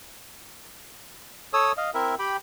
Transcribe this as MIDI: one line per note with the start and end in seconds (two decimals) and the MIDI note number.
1.53 1.72 69
1.53 1.72 73
1.53 1.72 87
1.53 1.72 88
1.77 1.91 75
1.77 1.91 77
1.94 2.15 60
1.94 2.15 64
1.94 2.15 70
1.94 2.15 76
2.19 2.37 67
2.19 2.37 79
2.19 2.37 83